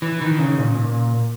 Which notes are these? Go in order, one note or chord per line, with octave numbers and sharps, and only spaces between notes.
E3
D#3
C#3
A#2
A#2